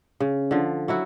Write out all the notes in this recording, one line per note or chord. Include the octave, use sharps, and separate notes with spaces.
C#3
D3 F3
F#3 E4 F#4